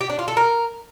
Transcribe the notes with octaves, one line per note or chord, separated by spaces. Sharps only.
G4
D4
F4
A4
A#4